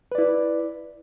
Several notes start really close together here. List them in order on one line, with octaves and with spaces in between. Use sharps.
B4 D5 E4